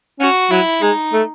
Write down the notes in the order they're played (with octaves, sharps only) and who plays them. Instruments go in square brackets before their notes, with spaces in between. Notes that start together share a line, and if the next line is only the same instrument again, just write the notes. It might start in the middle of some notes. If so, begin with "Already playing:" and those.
[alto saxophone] C#4 [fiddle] F#4
[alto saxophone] F#3 [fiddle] E4
[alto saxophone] G#3 [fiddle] D#4
[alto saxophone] A3